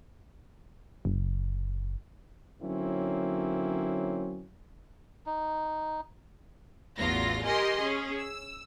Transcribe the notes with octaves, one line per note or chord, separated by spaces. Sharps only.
F#1
D3 F#3 A#3 C4 C#4 E4
D#4
A1 E2 F#3 F4 A#6
G4 A#4 D#5 G#5 C6
C#4 G#4
E6